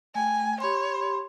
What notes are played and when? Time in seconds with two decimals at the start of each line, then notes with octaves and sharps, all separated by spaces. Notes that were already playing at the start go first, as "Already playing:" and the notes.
0.15 A3 G5 G#5
0.60 G4 C#5 B5 C6